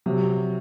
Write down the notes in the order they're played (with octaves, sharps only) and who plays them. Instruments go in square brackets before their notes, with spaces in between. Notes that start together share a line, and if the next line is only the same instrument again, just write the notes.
[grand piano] C3 [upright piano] F#3